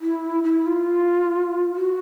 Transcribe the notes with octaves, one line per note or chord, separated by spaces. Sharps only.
E4
E4
F4
F#4